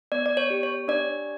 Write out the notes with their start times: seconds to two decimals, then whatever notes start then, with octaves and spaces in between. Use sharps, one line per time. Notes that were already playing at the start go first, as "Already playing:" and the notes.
0.12 B3 D5
0.26 D5
0.37 C#5
0.50 G4
0.63 C#5
0.88 D4 D5